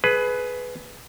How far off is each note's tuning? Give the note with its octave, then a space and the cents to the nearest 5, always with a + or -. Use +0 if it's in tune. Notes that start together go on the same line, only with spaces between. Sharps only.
G#4 +25 B4 +5